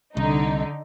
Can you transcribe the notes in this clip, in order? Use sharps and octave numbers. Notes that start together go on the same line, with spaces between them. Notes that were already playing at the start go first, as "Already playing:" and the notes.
C2 D3 D#4